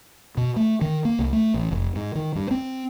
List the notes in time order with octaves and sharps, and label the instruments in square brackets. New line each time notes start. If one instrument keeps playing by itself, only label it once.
[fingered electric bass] B2
A3
D#3
A#3
C2
A3
A1
F1
G#2
D#3
G2
C4